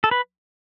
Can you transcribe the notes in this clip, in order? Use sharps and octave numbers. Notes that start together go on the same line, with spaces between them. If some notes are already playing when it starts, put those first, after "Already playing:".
A4
B4